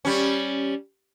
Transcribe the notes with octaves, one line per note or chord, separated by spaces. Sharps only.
G3 C#4